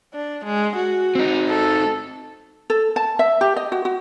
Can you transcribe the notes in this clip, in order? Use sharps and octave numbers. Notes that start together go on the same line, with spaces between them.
D4
G#3
F#4
C4 D#4
A4
A4
A5
E5
G4
D#5
F#4
F#4